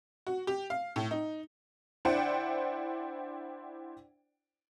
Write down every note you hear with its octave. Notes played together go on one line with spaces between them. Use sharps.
F#4
G4
F5
A2
D#4
D4 E4 C5 D5 F#5 G5